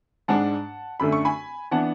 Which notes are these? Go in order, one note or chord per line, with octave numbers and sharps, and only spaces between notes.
G#2 G#3 D4 F#5 A5
F#2 D3 A3 B5
C#6
G#5 B5
E3 B3 D4 F#5 A5